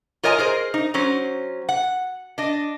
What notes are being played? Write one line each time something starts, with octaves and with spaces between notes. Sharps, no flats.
F4 A#4 C#5 D#5 G#5 A#5
G#4 A#4 C5 D#5
D#4
F#3 C#4 C5
F#5
D4 D#5